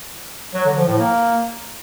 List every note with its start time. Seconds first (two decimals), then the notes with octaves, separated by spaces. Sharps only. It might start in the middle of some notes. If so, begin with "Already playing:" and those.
0.54 F#3
0.65 D3
0.76 F3
0.87 A2
0.99 A#3